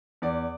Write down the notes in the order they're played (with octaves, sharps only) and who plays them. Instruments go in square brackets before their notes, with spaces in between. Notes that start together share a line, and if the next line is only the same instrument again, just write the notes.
[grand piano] E2 D5